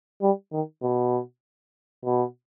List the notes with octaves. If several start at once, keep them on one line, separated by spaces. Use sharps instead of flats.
G3
D#3
B2
B2